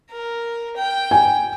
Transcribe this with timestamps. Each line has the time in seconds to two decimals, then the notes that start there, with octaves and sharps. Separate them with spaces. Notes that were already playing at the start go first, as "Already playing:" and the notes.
0.11 A#4
0.77 G5
1.11 G#5